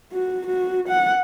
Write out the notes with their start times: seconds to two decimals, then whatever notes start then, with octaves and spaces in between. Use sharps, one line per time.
0.12 F#4
0.47 F#4
0.89 F#5